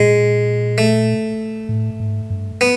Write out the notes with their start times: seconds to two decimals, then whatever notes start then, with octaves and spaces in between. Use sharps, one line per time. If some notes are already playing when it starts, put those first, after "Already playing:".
Already playing: A#2 G#3
0.78 A3
1.69 A2
2.00 G#2
2.30 G2
2.61 B3